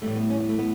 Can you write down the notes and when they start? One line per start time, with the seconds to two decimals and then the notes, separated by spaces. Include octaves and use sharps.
0.02 A2 E3 G3 A3
0.16 B3
0.30 C#4
0.40 B3
0.49 A3
0.59 B3